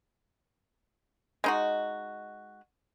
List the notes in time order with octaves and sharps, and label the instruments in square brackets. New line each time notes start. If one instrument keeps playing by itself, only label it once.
[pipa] G#3 D#4 F#4